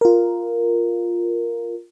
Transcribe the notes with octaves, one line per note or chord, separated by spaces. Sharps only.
F4 A#4